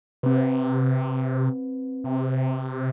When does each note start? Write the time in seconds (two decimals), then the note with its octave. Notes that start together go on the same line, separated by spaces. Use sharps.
0.23 C3 C4 B4
2.04 C3